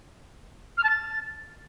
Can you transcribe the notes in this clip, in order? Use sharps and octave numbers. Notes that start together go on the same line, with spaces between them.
F6
A5
A6